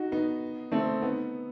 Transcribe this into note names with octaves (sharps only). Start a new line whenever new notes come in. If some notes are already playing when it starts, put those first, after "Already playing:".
Already playing: D#4 F#4
B3 D#4
A3 C4
B3 D#4